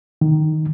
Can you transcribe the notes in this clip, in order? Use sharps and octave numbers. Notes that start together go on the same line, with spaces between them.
D#3